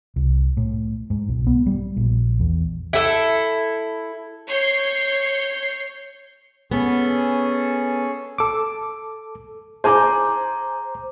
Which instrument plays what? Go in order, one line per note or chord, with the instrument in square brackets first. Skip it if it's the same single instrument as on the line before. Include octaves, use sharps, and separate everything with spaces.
[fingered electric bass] C2
A2
G#2
B1
B3
G3
A#1
E2
[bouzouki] E4 A4
[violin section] C#5 G6 C7 C#7
[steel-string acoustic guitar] B3 [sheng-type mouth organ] C#4 G#4 A4
[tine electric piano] A4 D6
[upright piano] G#4 G#5 D6 [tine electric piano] C5 A#5 G6